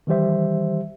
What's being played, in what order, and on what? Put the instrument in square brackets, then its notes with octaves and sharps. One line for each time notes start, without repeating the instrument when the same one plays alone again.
[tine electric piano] D#3 E3 G3 G4 C5 E5